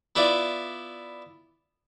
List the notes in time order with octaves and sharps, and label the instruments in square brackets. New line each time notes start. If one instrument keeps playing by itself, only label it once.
[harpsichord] B3 E4 F4 D5